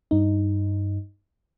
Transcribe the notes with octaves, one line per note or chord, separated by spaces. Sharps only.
G2 D#4